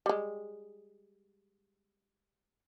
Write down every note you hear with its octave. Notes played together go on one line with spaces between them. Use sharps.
G3 G#3